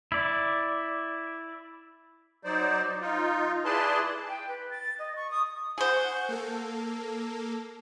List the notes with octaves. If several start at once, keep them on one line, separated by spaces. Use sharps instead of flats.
E4 D5
F#3 D#4 C5 D5
D#4 F4
E4 G#4 B4 D5 A5 C6
G5
B4
A6
D#5
C#6
D#6
G#4 C5 F#5 C#6 G6
A#3 A4